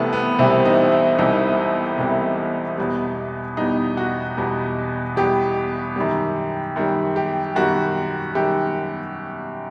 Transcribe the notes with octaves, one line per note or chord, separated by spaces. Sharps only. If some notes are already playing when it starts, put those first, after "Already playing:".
Already playing: C2 C3 E3 G3 A3 B3
B3
C2 C3 E3 G3 C4
D#4
E4
C2 C3 E3 G3 D#4
C2 C3 E3 G3
E2 B2 G3
E2 B2 G3 D#4
F#4
E2 B2 G3
E2 B2 G3 G4
F#2 D#3 G3
F#2 D#3 G3
G4
F#2 D#3 G3 F#4
F#2 D#3 G3 G4